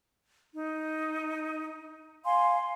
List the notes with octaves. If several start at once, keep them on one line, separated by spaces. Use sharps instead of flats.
D#4
F5 G#5 C6